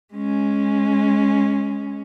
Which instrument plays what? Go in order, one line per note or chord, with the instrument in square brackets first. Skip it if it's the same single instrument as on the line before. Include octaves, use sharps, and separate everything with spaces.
[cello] G#3 C#4